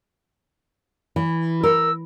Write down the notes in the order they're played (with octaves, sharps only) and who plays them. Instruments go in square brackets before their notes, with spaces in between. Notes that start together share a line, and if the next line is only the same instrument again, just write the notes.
[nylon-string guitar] E3
[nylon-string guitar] A#4 [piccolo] E6